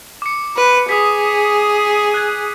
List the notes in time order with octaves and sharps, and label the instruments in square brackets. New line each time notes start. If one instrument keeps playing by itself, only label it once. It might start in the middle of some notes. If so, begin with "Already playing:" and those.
[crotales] D6 C#7
[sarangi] B4
[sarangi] G#4 [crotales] D#6 B6
[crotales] F#6 G#6